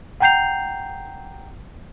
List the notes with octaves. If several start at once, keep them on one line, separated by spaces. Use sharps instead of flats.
F#5 G5 A#5 G6 C7 F7